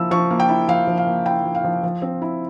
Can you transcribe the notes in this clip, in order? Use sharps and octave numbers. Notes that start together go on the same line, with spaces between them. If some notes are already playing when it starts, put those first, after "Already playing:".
Already playing: F3 A#3 E4 E6
F3 C#6
A#3
G5
E4
F3 F5
F3
F5
A#3
E4 G5
F3
F5
F3
F3
C4
E4